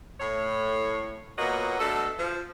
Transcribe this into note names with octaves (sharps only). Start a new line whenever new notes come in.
A2 C#5
A#2 A#3 B3 F#4 C#5 D#5
B2 A3 D4 A4
F3